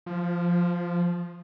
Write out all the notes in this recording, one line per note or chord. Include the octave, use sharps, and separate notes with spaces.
F3